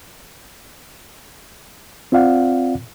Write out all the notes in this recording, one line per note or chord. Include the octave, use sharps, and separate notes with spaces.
C4 F4 D5 F5 F#5